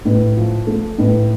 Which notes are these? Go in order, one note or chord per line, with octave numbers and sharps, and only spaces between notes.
A2 B4
F3
A3
A2 B4